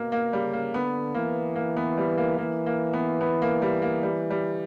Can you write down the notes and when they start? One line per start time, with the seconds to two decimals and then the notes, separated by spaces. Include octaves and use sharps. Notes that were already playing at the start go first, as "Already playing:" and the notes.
Already playing: B2 A#3
0.12 A#3
0.33 C#3 G3
0.53 A#3
0.74 D3 B3
1.15 E3 A#3
1.55 A#3
1.77 B3
1.98 G3
2.18 A#3
2.38 E3 A#3
2.66 A#3
2.93 B3
3.21 B3
3.42 A#3
3.62 G3
3.82 A#3
4.03 G3
4.30 G3